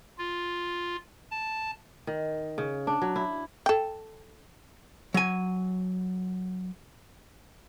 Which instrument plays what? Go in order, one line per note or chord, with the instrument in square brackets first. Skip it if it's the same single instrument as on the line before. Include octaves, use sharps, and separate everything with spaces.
[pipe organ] F4
A5
[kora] D#3
C#3
D4
F#3
E4
[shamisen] A4 G5
[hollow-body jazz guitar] F#3 G#5